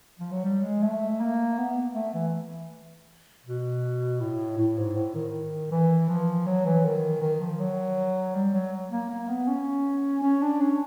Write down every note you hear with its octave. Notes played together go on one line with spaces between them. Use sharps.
F3
F#3
G3
G#3
A3
A#3
B3
A3
E3
B2
A2
A2
G#2
A2
D#3
E3
F3
F#3
E3
D#3
D#3
F3
F#3
G3
F#3
A#3
A#3
B3
C#4
C#4
D4
C#4